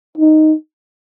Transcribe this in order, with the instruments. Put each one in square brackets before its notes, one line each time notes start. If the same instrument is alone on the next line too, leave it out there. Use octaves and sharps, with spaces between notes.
[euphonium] D#4